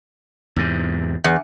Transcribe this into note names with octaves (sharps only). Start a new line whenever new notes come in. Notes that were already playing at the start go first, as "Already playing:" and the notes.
E2 G#2 C3
E2